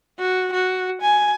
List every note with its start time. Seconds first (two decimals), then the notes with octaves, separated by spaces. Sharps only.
0.19 F#4
0.53 F#4
1.01 G#5